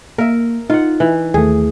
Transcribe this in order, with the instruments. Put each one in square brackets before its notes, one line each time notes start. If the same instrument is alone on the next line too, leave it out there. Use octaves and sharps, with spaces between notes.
[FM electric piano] A#3 [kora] A#4 E5
[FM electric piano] D#4 [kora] F4 F#5
[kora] E3
[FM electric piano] D#2 A3 [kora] G#4